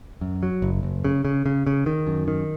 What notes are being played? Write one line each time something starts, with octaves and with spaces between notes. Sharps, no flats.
F#2
F#3
F#1
F#1
C#3
C#3
C#3
C#3
D#3
F#2
D#3